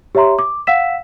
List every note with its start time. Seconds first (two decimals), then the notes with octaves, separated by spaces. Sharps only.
0.15 G4 C#5 E5 A#5 C6
0.39 D6
0.67 F5 F#5 E6 B6 E7